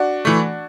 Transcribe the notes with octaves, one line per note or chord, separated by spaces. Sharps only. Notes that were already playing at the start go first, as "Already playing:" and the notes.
Already playing: D4 F#4
E3 A3